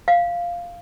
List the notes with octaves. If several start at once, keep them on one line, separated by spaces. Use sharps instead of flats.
F5